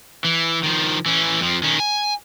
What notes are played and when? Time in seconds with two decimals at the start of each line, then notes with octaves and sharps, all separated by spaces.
0.25 E3
0.63 D#3 F3
1.06 E3 C#4
1.40 F2 F3
1.63 D#3 C#4
1.80 G#5